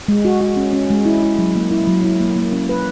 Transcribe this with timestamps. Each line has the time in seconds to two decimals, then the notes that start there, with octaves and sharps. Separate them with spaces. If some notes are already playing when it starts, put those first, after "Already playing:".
0.08 G#3
0.25 F#4
0.41 F#4
0.57 C#4
0.73 C#4
0.90 G#3
1.05 E4
1.23 E4
1.38 F#3
1.55 A#3
1.71 E4
1.87 F#3
2.04 E4
2.20 A#3
2.36 A#3
2.52 C#4
2.69 B4